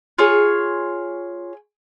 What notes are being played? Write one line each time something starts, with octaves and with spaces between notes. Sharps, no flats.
F4 G#4 C#5